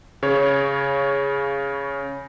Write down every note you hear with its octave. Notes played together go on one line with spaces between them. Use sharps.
C#3 C#5